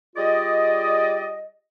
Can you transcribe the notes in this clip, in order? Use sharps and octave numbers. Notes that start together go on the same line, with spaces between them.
G3 F4 G#4 D5 D#5